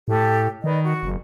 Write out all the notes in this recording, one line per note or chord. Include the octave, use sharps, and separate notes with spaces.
A2 G4 A4
D#3 B4 D5 D#5
F#4
F#1